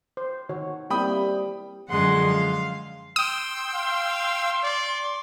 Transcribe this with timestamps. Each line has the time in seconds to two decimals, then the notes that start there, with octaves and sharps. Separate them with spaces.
0.17 C5
0.49 D#3 F#4 C#5
0.90 G3 A#3 C4 E4 G5 B5 D#6
1.90 F#2 D3 F3 G#3 F#5 C6
2.28 F5
3.16 G5 C6 D#6 E6
3.74 F5
4.63 D5